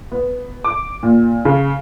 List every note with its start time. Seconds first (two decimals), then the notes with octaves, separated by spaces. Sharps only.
0.12 B3
0.64 D6
1.03 A#2
1.45 C#3